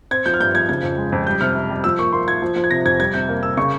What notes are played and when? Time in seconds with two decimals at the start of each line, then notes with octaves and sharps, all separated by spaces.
0.11 C4 G#6
0.26 F3 G6
0.34 F6
0.40 G2 G6
0.54 F3 G#6
0.69 C#3 G#6
0.83 F2
0.98 G#3
1.12 F2
1.27 G3 G6
1.41 C3 F6
1.55 C3
1.70 G3
1.84 F3 E6
1.99 A#3 C#6
2.13 A#3 C6
2.28 F3 G#6
2.42 F3
2.56 F3
2.64 G#6
2.71 C3 A#6
2.85 F2 G#6
2.99 G3 G#6
3.14 C3 G6
3.29 A#3
3.43 A#3 E6
3.57 C#3 C#6